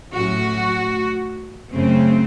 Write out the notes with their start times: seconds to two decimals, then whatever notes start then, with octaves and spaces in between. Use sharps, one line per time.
0.14 A2 F#3 A3 C#4 F#4
1.71 F#2 C#3 A3 C4